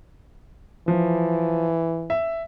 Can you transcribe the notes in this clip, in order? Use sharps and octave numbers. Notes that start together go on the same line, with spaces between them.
E3 F3
E5